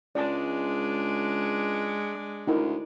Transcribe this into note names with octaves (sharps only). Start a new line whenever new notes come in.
C#2 G#3 D4 D5 A5
D2 D#4 E4 A#4